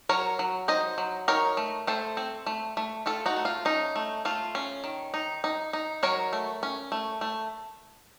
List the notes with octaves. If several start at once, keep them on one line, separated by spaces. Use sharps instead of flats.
F#3 A#4 C#5
F#3
D#4 C5 D#5
F#3
D#4 A#4 C#5
A3
A3 A4 C5
C4
A3
A3
A3 F4 A4
D#4 F#4
A3
F4
C#4 D#4
A3
A3 F4
C#4
D#3
D#4
D#4
D#4
F#3 A#4 C#5
A3
C#4
A3
A3